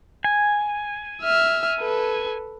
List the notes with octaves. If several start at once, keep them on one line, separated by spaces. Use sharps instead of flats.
G#5
E5 F6
A4 B4